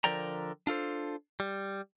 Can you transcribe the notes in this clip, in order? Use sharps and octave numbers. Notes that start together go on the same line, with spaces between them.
D3 F3 A#4 D5 G5 A#5
D4 F4 A4 C5
G3